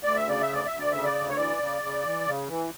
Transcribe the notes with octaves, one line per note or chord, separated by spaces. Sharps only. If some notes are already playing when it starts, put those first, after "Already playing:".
D2 D5
E5
C#3 D5
E5
D2
D5
D2 E5
D5
C#3 E5
D5
D2
C#5
E3 D5
C#3
C#3
E3
C#3
E3